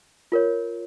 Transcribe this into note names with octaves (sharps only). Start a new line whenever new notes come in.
F4 A#4 C#5